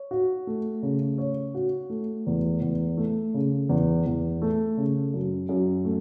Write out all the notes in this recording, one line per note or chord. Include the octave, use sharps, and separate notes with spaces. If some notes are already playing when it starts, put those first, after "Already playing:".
Already playing: C#5
F#4
A3
C#3
C#5
F#4
A3
E2
E2
A3
C#3
E2
E2
A3
C#3
F#2
F#2
A3